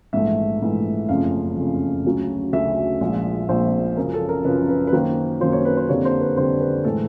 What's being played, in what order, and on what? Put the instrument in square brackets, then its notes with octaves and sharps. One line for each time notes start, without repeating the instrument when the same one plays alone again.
[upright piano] A#1 G#2 E3 A3 E5
A#1 G#2 E3 A3
F#1 F2 C#3 F3 A3 F5
F#1 F2 C#3 F3 A3
D2 C#3 F#3 A3
D2 C#3 F#3 A3 E5
A#1 A#2 F3 G#3
A#1 A#2 F3 G#3 C5
F#2 C#3 F3 A#4
A4
A#4
F#2 C#3 F3 B4
B4
B4
F#2 D#3 F#3 A#3 C5
F#2 D#3 F#3 A#3 C5
C#5
B4
C5
F2 D3 G3 A#3 C#5
C5
B4
F2 D3 G3 A#3 C5
B4
A2 E3 G#3 A4